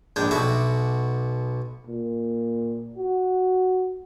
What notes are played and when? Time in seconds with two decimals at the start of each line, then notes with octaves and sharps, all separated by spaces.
0.16 A#1 G#3 D4 G5
0.31 B1 B2 F#4 E5 D6
1.87 A#2
2.97 F#4